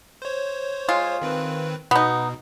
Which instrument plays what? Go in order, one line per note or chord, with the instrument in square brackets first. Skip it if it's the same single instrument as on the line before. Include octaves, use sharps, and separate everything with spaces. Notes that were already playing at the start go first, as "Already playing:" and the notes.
[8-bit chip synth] C5 C#5
[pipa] G#3 F4
[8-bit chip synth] D#3 C4 B4
[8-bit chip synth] B2 [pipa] B3 D#4